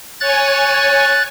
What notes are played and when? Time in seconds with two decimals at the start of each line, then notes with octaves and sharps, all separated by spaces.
0.21 C#5 G#5 F#6 A6